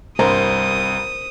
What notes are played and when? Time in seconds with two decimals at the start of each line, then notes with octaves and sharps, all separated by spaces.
0.19 C2 G2 A#4 C5 A#5 D#6